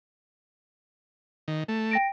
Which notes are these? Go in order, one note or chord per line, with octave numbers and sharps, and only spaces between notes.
D#3
A3
G5 A#6 D7